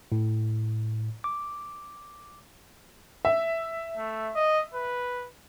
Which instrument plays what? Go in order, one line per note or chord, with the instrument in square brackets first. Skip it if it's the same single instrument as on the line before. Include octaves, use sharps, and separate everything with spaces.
[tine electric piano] A2
D6
[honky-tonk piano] E5
[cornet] A3
D#5
B4